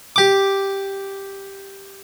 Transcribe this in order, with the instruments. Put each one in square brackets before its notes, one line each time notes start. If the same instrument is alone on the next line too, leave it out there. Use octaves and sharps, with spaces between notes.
[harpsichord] G4 D6